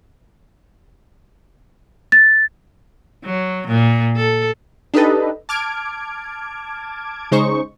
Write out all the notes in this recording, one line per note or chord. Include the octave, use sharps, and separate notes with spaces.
A6
F#3
A#2
A4
D4 D#4 G4 A4 B4 D#5
A5 D6 F6 G#6 D7
C#3 G#3 D#4 C5 C#6